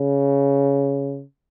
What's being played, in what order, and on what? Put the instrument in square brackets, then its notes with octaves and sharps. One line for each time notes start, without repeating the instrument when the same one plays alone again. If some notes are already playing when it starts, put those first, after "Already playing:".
Already playing: [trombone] C#3